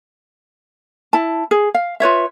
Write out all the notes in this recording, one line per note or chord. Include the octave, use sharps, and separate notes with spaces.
E4 A5
G#4
F5
F4 B4 C#5 E5